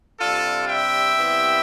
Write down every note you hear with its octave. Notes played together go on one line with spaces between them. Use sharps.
C3 G3 D4 F4 A4
E5 G5
C3 G3 B3 E4